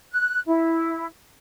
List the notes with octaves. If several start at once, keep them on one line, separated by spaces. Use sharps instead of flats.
F#6
E4